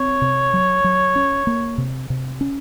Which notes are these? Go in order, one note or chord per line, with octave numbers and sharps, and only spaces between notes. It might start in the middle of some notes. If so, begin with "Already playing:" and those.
Already playing: C4 C#5
C3
F#3
F#3
C#4
A#3
C3
C3
C#4